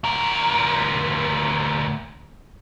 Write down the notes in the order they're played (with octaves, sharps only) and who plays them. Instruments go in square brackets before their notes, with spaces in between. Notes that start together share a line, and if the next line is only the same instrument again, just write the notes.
[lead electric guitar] D2 A#4